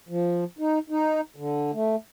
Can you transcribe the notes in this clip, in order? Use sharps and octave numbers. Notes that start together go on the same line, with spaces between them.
F3
D#4
D#4
D3
A3